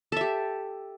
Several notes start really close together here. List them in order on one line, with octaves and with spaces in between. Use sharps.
A4 E5 G4